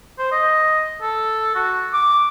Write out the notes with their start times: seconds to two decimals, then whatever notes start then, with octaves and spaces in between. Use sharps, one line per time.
0.18 C5
0.32 D#5
1.02 A4
1.55 F#4
1.93 D6